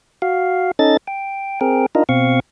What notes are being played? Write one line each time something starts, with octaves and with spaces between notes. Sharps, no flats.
F#4 F5
C#4 D#4 A4 D#5 A6
G5
C4 G#4 A#4 G5
D4 D#4 F4 A#4 D#5
B2 C4 F5 C#6